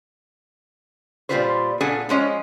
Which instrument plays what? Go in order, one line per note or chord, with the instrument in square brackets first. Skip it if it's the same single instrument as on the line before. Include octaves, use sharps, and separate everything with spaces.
[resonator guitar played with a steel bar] A#2 D#3 G3 F4 B4 C5
A#2 B3 D4 G#4 A4 G#5
F3 G#3 C#4 D#5